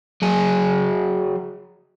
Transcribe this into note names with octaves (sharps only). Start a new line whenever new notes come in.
F#3 G#4